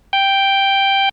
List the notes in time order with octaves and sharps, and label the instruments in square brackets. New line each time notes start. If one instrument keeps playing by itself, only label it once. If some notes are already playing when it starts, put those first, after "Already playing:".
[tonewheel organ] G5